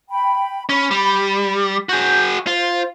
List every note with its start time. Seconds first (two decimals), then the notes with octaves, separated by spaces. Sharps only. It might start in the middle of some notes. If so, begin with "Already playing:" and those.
0.10 G5 B5
0.69 C#4 B5
0.91 G3
1.89 F#4 G#4 G6
2.47 F4 C5